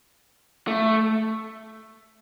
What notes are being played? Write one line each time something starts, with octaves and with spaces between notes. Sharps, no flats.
A3